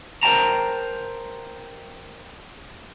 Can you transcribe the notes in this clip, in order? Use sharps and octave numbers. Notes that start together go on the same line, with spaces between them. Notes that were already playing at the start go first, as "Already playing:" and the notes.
A#4 C5 C#5 G5 A5 A#5